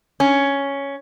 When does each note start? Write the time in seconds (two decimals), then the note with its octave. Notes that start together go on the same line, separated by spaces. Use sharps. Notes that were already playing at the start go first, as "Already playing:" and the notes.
0.20 C#4